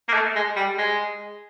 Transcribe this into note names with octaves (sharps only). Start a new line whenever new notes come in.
A#3
A3
G#3
G3
G#3